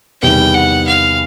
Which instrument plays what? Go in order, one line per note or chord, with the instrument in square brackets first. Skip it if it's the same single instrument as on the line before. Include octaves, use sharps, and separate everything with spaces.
[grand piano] E2 C3 D#3 G3 B3 [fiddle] G5
[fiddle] F#5
F5